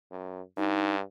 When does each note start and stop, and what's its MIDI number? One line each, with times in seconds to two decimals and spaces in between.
0.11 0.42 42
0.57 1.01 43
0.57 0.95 63